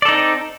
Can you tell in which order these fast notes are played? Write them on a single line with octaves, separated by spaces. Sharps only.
D5 A4 D#4 C4